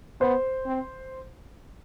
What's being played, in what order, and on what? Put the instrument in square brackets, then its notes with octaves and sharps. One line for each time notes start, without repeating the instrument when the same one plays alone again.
[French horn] B3 [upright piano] C5
[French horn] C4